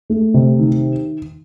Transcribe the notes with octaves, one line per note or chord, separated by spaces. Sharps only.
A3
C3
D#3